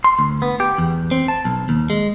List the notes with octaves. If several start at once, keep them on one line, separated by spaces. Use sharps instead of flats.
C6
D2
B3
G4
E2
C4
A5
B1
D#2
G#3